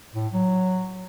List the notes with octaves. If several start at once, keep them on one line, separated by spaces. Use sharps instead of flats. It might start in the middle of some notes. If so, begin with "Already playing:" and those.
A2
F#3